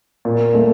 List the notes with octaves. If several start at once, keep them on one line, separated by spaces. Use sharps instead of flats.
A#2
A3